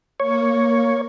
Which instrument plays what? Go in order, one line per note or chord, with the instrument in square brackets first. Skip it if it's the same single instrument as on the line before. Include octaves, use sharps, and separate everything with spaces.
[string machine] A#3 [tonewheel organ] C#5